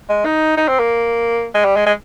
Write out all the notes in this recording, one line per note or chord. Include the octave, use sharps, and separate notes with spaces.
G#3
D#4
D#4
C4
A#3
G#3
G3
G#3
G#3